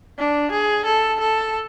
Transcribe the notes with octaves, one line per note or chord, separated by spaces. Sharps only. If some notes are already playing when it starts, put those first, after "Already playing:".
D4
G#4
A4
A4